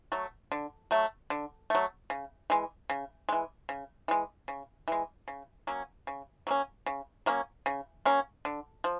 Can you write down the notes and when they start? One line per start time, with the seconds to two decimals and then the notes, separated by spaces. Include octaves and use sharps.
0.12 F#3 A3
0.52 D3
0.91 F#3 A3
1.30 D3
1.70 F#3 A3
2.10 C#3
2.50 E3 G#3
2.90 C#3
3.29 E3 G#3
3.69 C#3
4.08 E3 G#3
4.48 C#3
4.88 E3 G#3
5.28 C#3
5.67 F#3 A#3 C#4
6.07 C#3
6.47 F#3 A#3 C#4
6.86 C#3
7.26 F#3 A#3 C#4
7.66 C#3
8.05 F#3 A#3 C#4
8.45 D3
8.84 F3